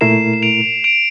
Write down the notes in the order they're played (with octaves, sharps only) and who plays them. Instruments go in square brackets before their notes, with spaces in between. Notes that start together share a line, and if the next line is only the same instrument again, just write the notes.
[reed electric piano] A#2 A3 E4 A#4 [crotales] C7 E7
[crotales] E7
D7 F7
D7 F7